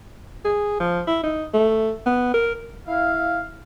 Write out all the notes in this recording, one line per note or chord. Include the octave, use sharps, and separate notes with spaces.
G#4
F3
E4
D#4
A3
B3
A#4
E4 F5